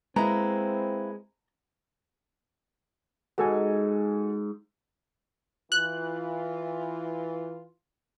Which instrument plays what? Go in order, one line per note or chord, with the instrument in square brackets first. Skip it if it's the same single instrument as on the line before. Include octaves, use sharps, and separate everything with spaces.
[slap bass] G#3 [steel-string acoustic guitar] A#3 E4 B4 [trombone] C4 [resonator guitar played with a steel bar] A#5
[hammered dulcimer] G#2 [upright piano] F#4 A4 G#5
[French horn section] E3 F4 [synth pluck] F#6